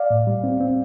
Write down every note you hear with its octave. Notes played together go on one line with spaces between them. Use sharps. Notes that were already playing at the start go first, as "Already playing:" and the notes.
Already playing: D5 F5
A2
G3
C4
C4